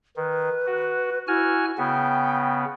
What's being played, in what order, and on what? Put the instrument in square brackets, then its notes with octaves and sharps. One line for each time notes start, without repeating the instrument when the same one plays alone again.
[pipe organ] D#3 [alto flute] B4
[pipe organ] F#4
[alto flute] E4 [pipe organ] F#4 G#5 F6
[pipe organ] C#3 B3 [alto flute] G5